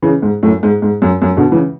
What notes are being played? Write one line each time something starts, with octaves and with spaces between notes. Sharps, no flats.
C#3 E3
G#2
F#2 A2
G#2
G#2
F#2
F#2
B2 D3
C#3 E3